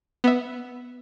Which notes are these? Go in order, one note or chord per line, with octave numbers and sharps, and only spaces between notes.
B3 E5